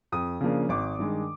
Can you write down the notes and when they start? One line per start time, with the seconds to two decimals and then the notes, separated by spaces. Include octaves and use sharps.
0.12 F2 D#6
0.41 C#3 F3 A#3 D4
0.69 G#1 D6
0.99 G2 D#3 G#3